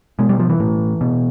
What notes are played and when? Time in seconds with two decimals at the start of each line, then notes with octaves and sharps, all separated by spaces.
0.19 B2 G#3
0.29 G3
0.40 F3
0.49 E3
0.60 A2
1.01 B2